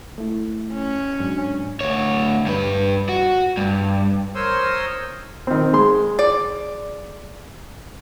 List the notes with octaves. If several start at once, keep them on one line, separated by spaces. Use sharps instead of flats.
A3 E4
C#4
G#2 F#3 D4
D2 C#5
G2 B4
F#4
G2
A#4 C5 C#5 C6 D#6 E6
D#3 C4
G#3 C6
D5